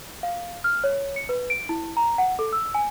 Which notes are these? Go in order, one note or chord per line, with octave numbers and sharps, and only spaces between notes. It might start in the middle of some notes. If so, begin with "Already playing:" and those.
F5
F6
C#5
C#7
B4
D7
E4
A#5
F#5
A4
E6
G#5